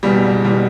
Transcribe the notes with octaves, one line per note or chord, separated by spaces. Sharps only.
F#1 E2 B2 G3
F#1 B2 G3